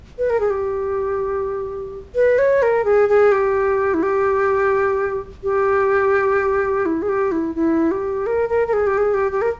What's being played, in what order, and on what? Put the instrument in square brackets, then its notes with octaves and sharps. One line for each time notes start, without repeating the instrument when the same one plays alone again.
[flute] B4
A#4
G#4
G4
B4
C#5
A#4
G#4
G#4
G4
E4
G4
G4
E4
G#4
G4
E4
E4
G4
A#4
A#4
A#4
G#4
G4
G#4
G4
G4
A#4